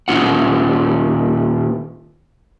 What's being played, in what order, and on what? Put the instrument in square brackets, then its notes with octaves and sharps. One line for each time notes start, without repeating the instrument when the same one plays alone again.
[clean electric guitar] D#2 A#2 A#3 C#4 F4 F#5